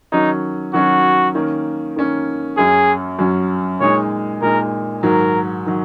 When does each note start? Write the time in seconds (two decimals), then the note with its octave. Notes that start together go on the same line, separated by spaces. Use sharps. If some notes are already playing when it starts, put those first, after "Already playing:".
0.12 D#3 F#3 C#4 D#4
0.74 D#3 F#3 C#4 F#4
1.35 D#3 A#3 C#4
1.96 D#3 A#3 C#4
2.57 F#2 F#3 C#4 G#4
3.19 F#2 F#3 C#4
3.80 A#2 G#3 D#4 C#5
4.42 A#2 G#3 D#4 A#4
5.03 G#2 D#3 F#3 A#4
5.66 D#3 F#3